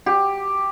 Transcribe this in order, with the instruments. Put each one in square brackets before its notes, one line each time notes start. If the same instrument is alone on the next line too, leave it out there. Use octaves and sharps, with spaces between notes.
[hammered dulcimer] G4